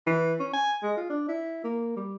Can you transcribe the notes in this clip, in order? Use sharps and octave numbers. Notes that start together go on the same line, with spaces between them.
E3
C#4
G#5
G#3
F4
D4
E4
A#3
G3